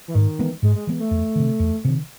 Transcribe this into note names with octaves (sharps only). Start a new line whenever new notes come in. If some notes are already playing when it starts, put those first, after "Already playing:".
E3
G#2 D#3
E3 G#3 B3
G#2 G#3
G#3
E3 G#3 B3
A3
E2
C3 D#3
E2
C3 D#3